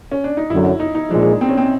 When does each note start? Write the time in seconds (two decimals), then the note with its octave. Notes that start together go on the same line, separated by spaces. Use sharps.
0.11 C#4
0.24 D4
0.37 D#4
0.50 F#2 D3 F#3 E4
0.80 D#4
0.95 D#4
1.10 A#2 F3 G#3 D4
1.41 C4
1.49 C#4
1.57 C4